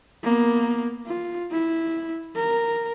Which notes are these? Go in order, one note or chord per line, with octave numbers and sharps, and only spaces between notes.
A#3 B3
F4
E4
A#4